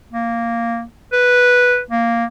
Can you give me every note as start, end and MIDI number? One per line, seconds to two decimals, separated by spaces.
0.13 0.83 58
1.13 1.80 71
1.90 2.25 58